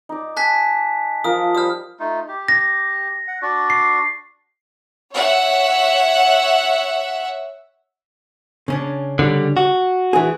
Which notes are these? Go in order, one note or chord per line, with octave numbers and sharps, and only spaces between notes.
D#4 D5
G#5 A5 F#6 B6
F3 A#4 F5 D#6
G3 C5 D#6 F6
A3 D#4 F4
G4
A#6
F#5
D4 F#4 D5
C7
C#5 E5 F#5
C#3 C#4 D4
D3 G3
F#4
E3 G#4